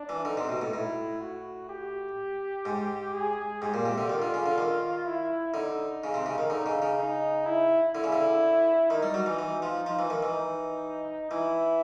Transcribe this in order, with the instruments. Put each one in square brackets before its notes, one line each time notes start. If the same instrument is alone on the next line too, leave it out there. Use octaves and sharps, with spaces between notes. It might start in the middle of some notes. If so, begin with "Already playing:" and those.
Already playing: [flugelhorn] D4
[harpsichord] E3
[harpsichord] D3 [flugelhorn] D#4
[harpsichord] C3
B2
A2
[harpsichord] A2 [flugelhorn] E4
[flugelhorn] F#4
G4
[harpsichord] G#2
[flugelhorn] G#4
[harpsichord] G#2 [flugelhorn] G4
[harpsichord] A#2
C3
D3
[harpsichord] D#3 [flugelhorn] F4
[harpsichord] D3
C#3
D3
D#3
[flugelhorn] E4
[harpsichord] D3 [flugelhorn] D#4
[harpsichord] C#3
C3
C#3
D#3
[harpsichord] D3 [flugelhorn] D#4
[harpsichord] C#3
C#3
[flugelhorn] D#4
E4
[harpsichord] D3 [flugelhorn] E4
[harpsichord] C#3
D3
[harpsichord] D#3 [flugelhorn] D#4
[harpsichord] G3
F#3
E3
E3
F3
[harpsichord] F3 [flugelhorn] D#4
[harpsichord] E3
D#3
E3
[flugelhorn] D#4
[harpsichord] E3 [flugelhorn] E4